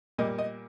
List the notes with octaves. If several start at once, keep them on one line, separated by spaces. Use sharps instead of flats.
A#2 G3 A#3 D#5
D#5